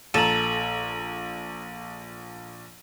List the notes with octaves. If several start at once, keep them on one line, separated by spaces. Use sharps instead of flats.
A#1 A4 A#5 D#7 F#7